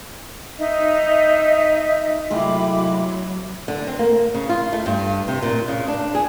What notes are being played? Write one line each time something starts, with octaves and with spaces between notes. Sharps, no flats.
D#4 D#5 E5
C3 F#3 G#3 A3 E4 F4 B5 D6
D3
C4
A#3
C#3
F4
A3
G2
C3
A#2
C#3
D4
G#4